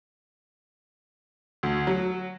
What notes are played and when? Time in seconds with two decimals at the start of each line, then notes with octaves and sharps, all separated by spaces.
1.63 D2
1.87 F#3